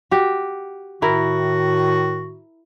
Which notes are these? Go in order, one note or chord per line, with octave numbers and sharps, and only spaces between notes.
F#4 G4
A2 D#3 E4 F#4 A#4